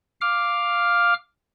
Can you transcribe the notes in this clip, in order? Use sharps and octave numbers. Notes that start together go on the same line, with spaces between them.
F5 D6 F6